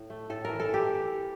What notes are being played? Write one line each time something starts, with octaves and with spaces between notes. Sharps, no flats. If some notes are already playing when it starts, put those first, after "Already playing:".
Already playing: A2
A3
A2 A4
E3 A#4
A4
E3
G4